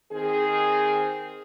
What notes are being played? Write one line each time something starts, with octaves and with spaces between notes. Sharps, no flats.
D#3 C4 G#4